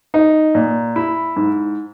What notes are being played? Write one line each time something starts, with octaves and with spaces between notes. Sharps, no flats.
D#4
A#2
E4
G#2